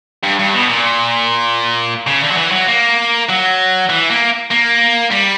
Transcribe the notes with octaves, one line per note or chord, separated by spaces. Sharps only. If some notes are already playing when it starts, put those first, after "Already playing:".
G2
G2
B2
A#2
C#3
D3
F#3
E3
F#3
A#3
F#3
E3
A#3
A#3
G3